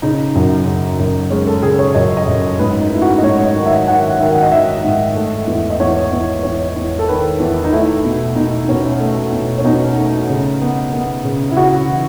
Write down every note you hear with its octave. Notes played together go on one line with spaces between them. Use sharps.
C#3 D#4
F#2
C#3
F#2
G#3 C#4
A4
C#3 G#4
C#5
F#2 D#5
D#5
F#2
G#2 B4
D#4
A3 E4
F#4
D#5
G#2 C#5
D#5
D#3
E5
D#3 F#5
D#3 E5
D#5
D#3 E5
G#2
A3
E2
D#5
E2 C#5
E2
E2 C#5
E2
A4
D#3 B4
E2
D#4
A3 E4
B2
B2 D#4
B2 C#4
A3
B2
C#4
B2 D#4
A3
C#3
B3
B3
C#3
E4
C#3 F#4
E3